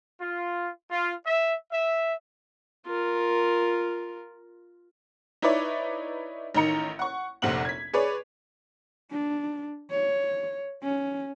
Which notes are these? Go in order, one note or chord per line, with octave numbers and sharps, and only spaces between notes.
F4
F4
E5
E5
F4 A#4
D#4 E4 B4 C#5 D5 E5
A1 D#3 D#4 A#5 C#7
F#5 C#6
F1 A#1 C3 C4 F#5 F#7
G#6 B6
G#4 B4 C#5 D5
D4
C#5
C#4